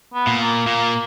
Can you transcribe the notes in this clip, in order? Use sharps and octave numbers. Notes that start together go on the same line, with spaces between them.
B3
A#2
A#3
A#2